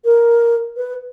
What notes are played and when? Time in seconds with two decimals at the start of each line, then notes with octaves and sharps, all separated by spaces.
0.05 A#4
0.77 B4